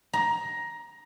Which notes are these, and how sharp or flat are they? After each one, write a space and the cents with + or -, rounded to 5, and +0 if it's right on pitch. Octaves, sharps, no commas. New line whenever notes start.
A#5 +15